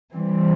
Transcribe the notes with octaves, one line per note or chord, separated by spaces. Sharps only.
E3 G3 C4